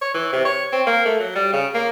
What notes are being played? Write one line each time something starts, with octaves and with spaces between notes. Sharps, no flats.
C#5
E3
C3
C#5
C4
A#3
A3
F#3
G3
C#3
A#3